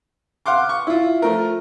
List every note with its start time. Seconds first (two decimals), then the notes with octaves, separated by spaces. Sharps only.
0.46 F5 F#5 C6 D6
0.69 C#6
0.87 E4 F4
1.22 F3 A3 A#4